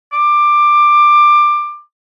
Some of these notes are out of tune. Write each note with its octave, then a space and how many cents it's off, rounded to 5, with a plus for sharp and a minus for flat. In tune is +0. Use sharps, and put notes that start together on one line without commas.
D6 +15